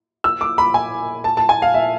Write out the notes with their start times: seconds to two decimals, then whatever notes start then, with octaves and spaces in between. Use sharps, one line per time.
0.24 E6
0.41 D6
0.58 B5
0.74 G#5
1.24 A5
1.37 A5
1.49 G#5
1.62 F5
1.74 E5